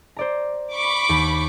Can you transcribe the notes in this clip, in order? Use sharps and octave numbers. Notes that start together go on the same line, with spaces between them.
C5 D5 A#5
B5 C#6 D6
D#2